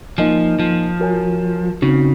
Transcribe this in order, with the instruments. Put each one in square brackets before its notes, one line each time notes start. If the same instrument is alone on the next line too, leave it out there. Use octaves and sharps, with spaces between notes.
[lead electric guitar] F3 [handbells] A#3 D#4 A#4 D#5 G#5
[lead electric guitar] F3
[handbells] F#4 A#4 C#5 G#5
[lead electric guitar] C#3 [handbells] C4 D#4 F#4